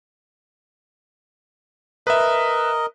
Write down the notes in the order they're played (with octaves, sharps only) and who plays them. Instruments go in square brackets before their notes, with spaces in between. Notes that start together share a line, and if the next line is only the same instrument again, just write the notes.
[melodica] A#4 D#5 [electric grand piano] B4 E5